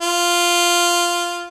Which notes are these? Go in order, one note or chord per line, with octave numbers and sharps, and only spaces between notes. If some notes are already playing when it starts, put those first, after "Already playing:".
F4